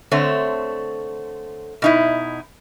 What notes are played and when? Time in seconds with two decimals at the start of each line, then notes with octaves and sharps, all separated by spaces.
0.11 D3 A3 C4 C#5
1.82 B2 D#4 E4